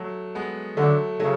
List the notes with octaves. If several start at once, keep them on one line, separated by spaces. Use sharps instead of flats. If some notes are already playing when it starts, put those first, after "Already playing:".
Already playing: F#3 A3
G#3 B3
D3 F#3 A3
C#3 F#3 A3